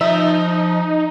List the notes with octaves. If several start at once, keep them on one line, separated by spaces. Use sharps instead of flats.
F3 D#4 E5